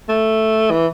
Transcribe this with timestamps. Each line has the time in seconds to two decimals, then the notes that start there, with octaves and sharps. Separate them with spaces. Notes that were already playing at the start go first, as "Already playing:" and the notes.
0.09 A3
0.70 E3